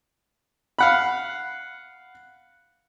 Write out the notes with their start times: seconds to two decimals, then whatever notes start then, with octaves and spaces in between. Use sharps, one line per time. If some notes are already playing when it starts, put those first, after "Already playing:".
0.79 F5 F#5 B5